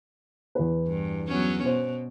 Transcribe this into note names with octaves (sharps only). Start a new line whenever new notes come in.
E2 B4
G2
F#3 B3 C#4
B2 C5